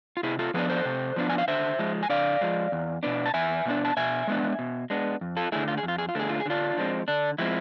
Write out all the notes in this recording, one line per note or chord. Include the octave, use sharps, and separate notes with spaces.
F4
C3 E4 G#4
F4 A4
F3 B3 D4 G#4 B4
A4 C5
C3
F3 B3 D4
G#5
F5
D3 C5 E5
F3 G#3
G#5
D3 D5 F5
F3 G#3
E2
B2 B3 D4
A5
E2 E5 G#5
B2 B3 D4
A5
B2 E5 G#5
G#3 B3 D4
B2
G#3 B3 D4
F2
F4 A4
D3 A3 E4 G#4
F4
G#4
F2
F4
G#4
F4
D3 A3 G#4
F4
G#4
D3 D4 F4
F3 G#3 C4
D3 D4
F3 G#3 C4 E4